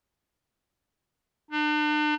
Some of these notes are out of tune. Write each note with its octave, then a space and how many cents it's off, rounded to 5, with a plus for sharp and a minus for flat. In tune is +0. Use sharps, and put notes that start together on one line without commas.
D4 +40